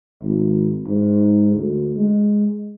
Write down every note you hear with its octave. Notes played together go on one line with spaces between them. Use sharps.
G#1
G#2
D2
G#3